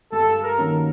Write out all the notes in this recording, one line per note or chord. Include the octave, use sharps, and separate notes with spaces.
G2 A4
A#4
D#3 F#3 A#3 C#4